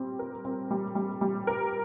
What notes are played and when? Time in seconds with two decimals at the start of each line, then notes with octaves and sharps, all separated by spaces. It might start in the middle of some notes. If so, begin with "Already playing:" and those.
Already playing: G3 C4
0.19 A#4
0.45 C4
0.71 G3
0.95 G3
1.21 G3
1.47 A#4